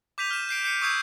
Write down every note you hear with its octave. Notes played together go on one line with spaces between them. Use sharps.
D6 G6 B6 D#7 F7
F6 E7
G6 C7 D7
G6 C7 C#7 D#7
C#6 D#6 E6 G6 G#6 C7